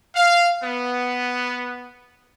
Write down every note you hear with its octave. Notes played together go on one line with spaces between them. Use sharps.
F5
B3